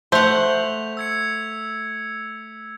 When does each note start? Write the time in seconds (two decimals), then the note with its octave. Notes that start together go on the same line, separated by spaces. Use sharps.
0.12 A3 C5 F#5 B6 F7
0.97 E6 G#6 C#7